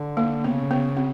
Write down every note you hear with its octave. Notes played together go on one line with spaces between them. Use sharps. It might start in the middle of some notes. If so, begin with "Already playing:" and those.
Already playing: D3
A#3
C#3 B3
B3
C4